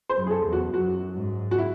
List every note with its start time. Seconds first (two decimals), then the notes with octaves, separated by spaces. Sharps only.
0.09 C5
0.16 F#2
0.26 G#4
0.31 A4
0.45 E2
0.53 F#4
0.73 F#2 F#4
1.15 G#2
1.51 F#4
1.58 E4